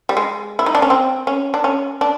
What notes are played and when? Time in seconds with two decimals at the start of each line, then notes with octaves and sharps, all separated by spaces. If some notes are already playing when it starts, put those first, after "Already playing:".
0.09 G3
0.17 G#3
0.59 E4
0.66 D#4
0.75 D4
0.82 C#4
0.90 C4
1.27 C#4
1.54 D4
1.64 C#4
2.01 D4